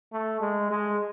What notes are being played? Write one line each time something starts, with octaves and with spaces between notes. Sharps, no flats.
A3
G#3
G#3